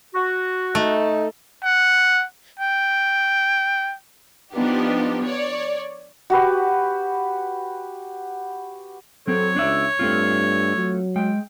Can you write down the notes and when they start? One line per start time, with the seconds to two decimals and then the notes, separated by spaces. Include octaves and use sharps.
0.15 F#4
0.75 A3 D#4
1.64 F#5
2.59 G5
4.53 F3 B3 D4 D#4 G4
5.23 C#5 D5
6.30 F#4 G4 B4
9.27 F#3 C4 A4 C#5
9.56 C#2 D4 D5 E5
9.99 G2 A3 C4 F4
10.77 F#3
11.16 G#3 G5